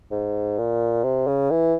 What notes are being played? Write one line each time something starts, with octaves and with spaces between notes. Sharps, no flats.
G#2
A#2
C3
C#3
E3